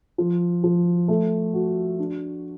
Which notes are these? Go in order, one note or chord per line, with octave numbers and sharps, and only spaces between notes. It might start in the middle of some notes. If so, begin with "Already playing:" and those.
F3
F3
A3
F#4
D4